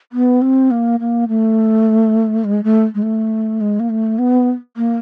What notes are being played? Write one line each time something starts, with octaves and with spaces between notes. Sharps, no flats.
B3
C4
A#3
A#3
A3
G#3
A3
G#3
A3
G#3
A#3
A3
B3
A#3